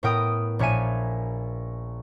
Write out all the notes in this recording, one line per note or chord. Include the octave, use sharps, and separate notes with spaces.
A2 B3 A#4 G5 D#6 D7
A#1 A#2 C#5 E5 G#5 D#7